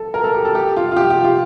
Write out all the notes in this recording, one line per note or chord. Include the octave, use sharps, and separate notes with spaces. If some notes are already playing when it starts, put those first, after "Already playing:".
Already playing: A4
A#4
A4
G4
A4
G4
F4
F4
G4
G4
F4